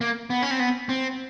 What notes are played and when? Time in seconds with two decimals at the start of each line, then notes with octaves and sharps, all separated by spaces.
0.01 A#3
0.30 B3
0.42 C#4
0.51 C4
0.60 B3
0.89 C4